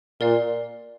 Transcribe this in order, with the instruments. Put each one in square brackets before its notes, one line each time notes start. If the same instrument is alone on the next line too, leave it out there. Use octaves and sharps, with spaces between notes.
[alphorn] A#2 [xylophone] A#4 D5 F5